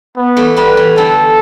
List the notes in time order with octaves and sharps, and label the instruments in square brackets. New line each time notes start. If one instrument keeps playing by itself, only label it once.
[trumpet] B3
[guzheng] E3 A3
[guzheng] G3 B3 [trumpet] B4
[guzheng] E3
[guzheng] D3 G3 [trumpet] A4